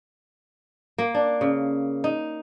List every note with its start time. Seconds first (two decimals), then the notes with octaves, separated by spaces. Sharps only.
0.98 A#3
1.15 D4
1.41 C#3
2.04 D#4